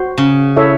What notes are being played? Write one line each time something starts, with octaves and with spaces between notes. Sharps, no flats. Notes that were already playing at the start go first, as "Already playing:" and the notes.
Already playing: F#4 C5
C#3
E4 A4 C#5 E5